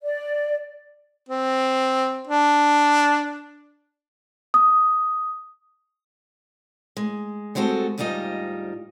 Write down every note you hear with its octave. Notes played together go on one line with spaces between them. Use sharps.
D5
C4
D4
D#6
G#3
G3 G#3 C4 F#4 A4
D2 G#2 G3 D#4 F4 D#5